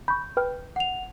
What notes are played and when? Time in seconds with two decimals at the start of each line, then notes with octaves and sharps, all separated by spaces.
0.08 B5 C#6 G6
0.37 B4 G5 F6
0.76 F#5 F7